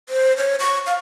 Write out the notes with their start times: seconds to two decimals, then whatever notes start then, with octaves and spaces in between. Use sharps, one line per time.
0.09 C5
0.37 C#5
0.60 C#6
0.87 F5